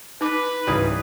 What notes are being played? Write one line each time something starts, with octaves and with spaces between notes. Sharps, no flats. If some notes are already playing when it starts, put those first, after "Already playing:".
D#4 B4 D6
C#2 G#2 E3 G3 G#4 D5